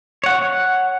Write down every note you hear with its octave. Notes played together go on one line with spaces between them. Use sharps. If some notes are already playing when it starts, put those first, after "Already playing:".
C#5 F#5